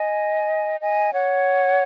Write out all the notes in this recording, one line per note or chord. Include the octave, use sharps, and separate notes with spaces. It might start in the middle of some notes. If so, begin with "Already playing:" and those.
Already playing: D#5 G#5
D#5 G#5
C#5 F#5